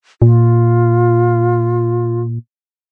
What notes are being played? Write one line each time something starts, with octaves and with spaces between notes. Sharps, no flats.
A#2 F4